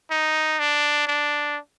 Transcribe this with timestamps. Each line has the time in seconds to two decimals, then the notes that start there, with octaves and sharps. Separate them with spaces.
0.11 D#4
0.59 D4
1.07 D4